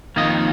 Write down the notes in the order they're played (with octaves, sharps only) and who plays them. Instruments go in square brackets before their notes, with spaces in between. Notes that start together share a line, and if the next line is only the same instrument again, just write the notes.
[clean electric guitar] F2 D#3 A#3 D#5